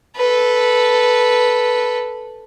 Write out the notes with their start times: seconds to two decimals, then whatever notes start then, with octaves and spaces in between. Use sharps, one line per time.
0.17 A4 B4